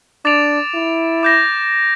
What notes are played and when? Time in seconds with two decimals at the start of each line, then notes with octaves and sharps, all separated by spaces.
0.25 D4 D6 A6 D7 F7
0.74 E4
1.23 D6 G6 A#6